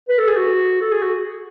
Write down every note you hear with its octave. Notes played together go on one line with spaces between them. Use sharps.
B4
A4
G#4
F#4
A4
G#4
F#4